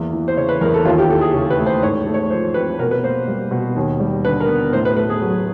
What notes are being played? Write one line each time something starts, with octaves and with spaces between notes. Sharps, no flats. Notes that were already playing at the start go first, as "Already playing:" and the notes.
Already playing: E2 A#3
E3
C5
C#3 C#5
B4
E2 A#4
A4
D#2 F4
G4
E3 A4
G#4
C#3
B4
A3
C5
G#2 C#5
A3
C#5
F3 C5
C4 B4
B2 A#4
B4
A#3 C5
G3
B2
D#2
G3
D3 B4
A#4
B3
A2 C5
B4
A3 B4
G#4
F#3